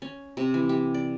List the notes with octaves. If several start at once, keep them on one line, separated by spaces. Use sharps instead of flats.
C#4
C3
E3
G4
D5